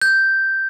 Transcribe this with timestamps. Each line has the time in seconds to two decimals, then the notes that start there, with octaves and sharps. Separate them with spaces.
0.02 G6